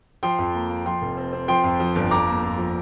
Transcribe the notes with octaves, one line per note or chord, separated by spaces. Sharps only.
F3 G5 C6
F2
A#3
A#3
F3 G5 C6
F1
C4
C4
F3 G5 C6
F2
F3
G1
F2 A#5 D6
A#3
F2
F3